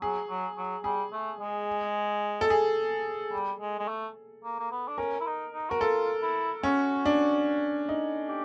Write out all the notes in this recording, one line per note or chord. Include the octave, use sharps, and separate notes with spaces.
F#3 G#4
F#3
F#3
G3 G#4
A3
G#3
A4
G#4
G3
G#3
G#3
A3
A#3
A#3
B3
D4
C#4 A#4
E4
D#4
D#4
F#4 A#4
F4 A4
E4
C#4 F#4
D4
D#4
G4